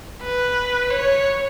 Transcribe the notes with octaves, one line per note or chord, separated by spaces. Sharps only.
B4
C#5